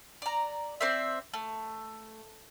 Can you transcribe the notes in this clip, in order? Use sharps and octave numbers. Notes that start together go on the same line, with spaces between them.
D5 A#5
C4 C5 D5 E5
A3